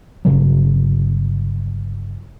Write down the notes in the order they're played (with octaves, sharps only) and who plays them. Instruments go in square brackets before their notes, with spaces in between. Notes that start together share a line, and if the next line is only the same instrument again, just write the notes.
[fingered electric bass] G1 D#2 C#3 F#3